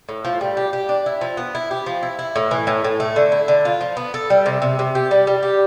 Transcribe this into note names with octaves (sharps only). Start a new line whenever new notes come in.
A2
F3
G3
G4
G4
D4
E4
F3
B3
E4
G4
F3
E4
E4
A2
E3
A2
A2
A3
D3
E4
D3
F4
F3
B3
A4
G3
C3
C3
C3
G4
G3
G3
G4